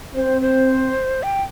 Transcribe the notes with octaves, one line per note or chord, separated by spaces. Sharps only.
C4 C5
C5
G5